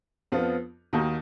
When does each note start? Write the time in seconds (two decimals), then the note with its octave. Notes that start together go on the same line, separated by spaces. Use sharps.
0.32 F2 F3 B3 F4
0.93 D#2 D#3 A#3 D#4 F#4